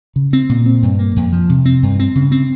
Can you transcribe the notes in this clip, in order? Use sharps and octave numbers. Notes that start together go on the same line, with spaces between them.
C#3
C4
A#2
C4
G2
A#3
F2
F3
C3
C4
G2
C4
C#3
C4